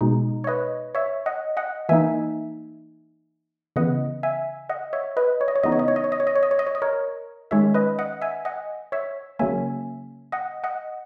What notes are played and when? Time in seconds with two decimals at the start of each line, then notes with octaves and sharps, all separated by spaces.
0.01 B2 G#3 D#4
0.44 C#5
0.47 B4 D#5
0.95 C#5 E5
1.26 D#5 F#5
1.57 D#5 F#5
1.89 E3 A#3 D#4 E5 G#5
3.76 C#3 E3 B3 D#5 F#5
4.23 E5 G#5
4.69 D#5 F#5
4.93 C#5 E5
5.17 B4 D#5
5.41 C#5
5.48 D#5
5.56 C#5
5.63 C#3 E3 B3 D#4 D#5
5.72 C#5
5.79 D#5
5.88 C#5
5.96 D#5
6.04 C#5
6.12 D#5
6.20 C#5
6.27 D#5
6.36 C#5
6.43 D#5
6.51 C#5
6.59 D#5
6.67 C#5
6.75 D#5
6.82 A#4 C#5
7.51 D#3 G#3 C#4 C#5 E5
7.74 B4 D#5
7.99 D#5 F#5
8.21 E5 G#5
8.45 D#5 F#5
8.92 C#5 E5
9.39 C#3 F#3 A#3 C#4 E5 G#5
10.32 D#5 F#5
10.64 D#5 F#5